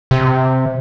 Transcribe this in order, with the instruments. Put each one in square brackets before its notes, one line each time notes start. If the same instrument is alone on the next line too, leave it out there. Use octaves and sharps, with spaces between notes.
[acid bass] C3